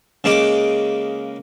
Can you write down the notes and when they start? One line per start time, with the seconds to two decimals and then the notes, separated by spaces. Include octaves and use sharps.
0.24 C#3 G#3 A#3 D#5 D6